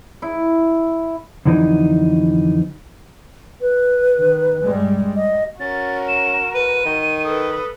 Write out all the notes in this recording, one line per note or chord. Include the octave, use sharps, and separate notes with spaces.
E4
F2 D3 E3 F#3 D#4
B4
D#3
G2 G3 G#3
G3 D#5
C#4 F#4 A#4 A6
E7
B4 D#7
D#3
A4 B4 D#6